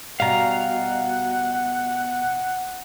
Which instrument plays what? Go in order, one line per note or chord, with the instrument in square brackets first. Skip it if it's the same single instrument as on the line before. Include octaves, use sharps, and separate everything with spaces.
[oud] B2 G3 [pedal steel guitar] F5 A#5 [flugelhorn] F#5